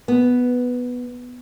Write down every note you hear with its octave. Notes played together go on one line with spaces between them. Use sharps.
B3